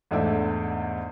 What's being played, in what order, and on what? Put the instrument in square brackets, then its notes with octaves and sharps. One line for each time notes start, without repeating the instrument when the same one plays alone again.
[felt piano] E2 G#2 A3 D4 D5 E5